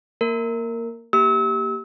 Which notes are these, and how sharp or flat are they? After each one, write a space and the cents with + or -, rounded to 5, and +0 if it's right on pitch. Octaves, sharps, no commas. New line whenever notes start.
A#3 -5 A#4 -15
A#3 +0 G4 -5 E6 -35